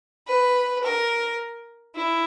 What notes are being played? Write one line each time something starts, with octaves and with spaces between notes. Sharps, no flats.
B4
A#4
E4